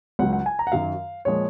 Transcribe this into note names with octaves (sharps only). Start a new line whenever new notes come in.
C#2 C#3 F#3 F#5
F#5
G#5
A#5
F#5
F#2 D#3 F#3 F5
A#2 F3 G#3 C#5